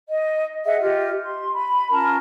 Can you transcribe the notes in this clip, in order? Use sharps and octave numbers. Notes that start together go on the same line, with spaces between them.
D#5
G#4 D#5 E5 F#5
F4 G4 D#5
C6
B5
C#4 F4 A#4 A5